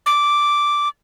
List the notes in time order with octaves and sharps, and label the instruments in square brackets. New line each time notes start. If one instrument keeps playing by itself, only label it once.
[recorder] D6